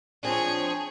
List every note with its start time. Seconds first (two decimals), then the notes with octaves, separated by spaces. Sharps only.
0.23 F3 C4 D4 G#4 C#5